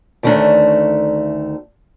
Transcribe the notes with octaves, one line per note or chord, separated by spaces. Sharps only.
D2 D#3 A3 C#4 D4